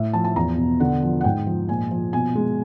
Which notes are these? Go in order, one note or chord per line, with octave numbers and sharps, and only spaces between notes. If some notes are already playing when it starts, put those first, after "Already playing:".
Already playing: A2 E5
F3 A5
A5
E2 A#5
B2
D3 F#5
F3
F#5
G#2 G5
F3
A#2 G#5
F3
B2 G#5
G#3